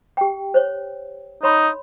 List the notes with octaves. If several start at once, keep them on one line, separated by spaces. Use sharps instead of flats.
G4 G5
C5 C#5
D#4 C#5 B5 C6